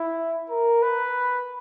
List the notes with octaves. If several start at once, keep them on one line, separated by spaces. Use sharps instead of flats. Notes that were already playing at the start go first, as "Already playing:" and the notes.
Already playing: E4
A#4
B4